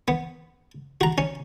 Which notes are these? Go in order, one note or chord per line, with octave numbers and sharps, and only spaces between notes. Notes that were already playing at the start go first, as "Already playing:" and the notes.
B3
F#4 A#5
C#4